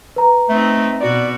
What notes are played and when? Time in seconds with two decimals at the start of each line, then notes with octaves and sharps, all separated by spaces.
0.16 B4 A#5
0.49 A3 C4 D#4
1.01 B2 F#4 D5